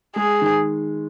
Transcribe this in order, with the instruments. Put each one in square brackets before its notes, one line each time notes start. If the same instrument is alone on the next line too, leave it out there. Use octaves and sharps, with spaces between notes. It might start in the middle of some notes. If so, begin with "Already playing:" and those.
[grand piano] G#3 [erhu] G#4
[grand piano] D#3